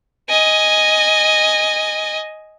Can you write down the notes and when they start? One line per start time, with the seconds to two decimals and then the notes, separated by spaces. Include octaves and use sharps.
0.29 D#5 G#5